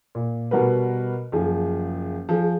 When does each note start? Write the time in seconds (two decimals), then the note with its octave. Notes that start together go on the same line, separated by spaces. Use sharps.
0.15 A#2
0.51 B2 G3 F#4 A#4 B4
1.32 F#1 F3 G#4
2.29 F3 G#4